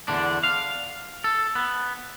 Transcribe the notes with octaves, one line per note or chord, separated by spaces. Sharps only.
E2 D3 D4
F5
A4
B3